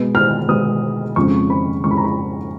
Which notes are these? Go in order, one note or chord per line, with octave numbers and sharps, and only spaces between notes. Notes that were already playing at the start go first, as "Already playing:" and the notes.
Already playing: B2 G#3 B3
F6
B2 G#3 B3 D#6
F2 C#3 G#3 C#4 C#6
B5
F2 C#3 G#3 C#4 C#6
B5
A#5
B5